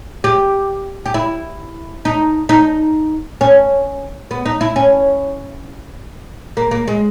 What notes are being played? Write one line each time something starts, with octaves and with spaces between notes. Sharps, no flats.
G4
G4
E4
D#4
D#4
C#4
B3
D#4
E4
C#4
A#3
A#3
G#3